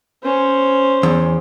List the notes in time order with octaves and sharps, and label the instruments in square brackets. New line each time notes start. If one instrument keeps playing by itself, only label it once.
[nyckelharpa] C#4 C5
[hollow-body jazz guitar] E2